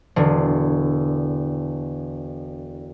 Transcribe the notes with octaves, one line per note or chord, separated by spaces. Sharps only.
E1 D3